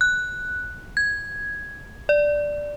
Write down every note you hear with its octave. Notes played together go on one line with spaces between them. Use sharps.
F#6
G#6
D5